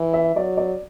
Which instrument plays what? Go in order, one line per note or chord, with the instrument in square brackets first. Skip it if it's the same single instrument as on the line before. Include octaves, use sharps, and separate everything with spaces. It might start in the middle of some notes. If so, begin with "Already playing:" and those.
Already playing: [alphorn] E3
[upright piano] E5
[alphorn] F#3 [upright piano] D5
[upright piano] D5